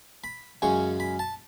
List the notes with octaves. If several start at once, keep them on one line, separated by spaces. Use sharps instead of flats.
B5
F#2 C#3 G#3 C#6
B5
A5